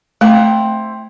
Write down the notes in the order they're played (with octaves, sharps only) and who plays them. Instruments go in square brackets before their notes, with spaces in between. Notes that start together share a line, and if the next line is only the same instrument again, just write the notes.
[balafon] A3 [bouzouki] C4 E4 A#5